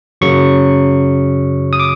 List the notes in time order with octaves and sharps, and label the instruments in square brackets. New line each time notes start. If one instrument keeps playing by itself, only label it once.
[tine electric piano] F#2 C#3 F#3 C#6
D#6
D6